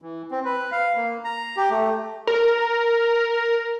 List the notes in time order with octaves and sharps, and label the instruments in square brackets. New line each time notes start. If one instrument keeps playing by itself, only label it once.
[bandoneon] E3
C4
B4
F5
A#3
A#5
G4
A3
[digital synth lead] A#4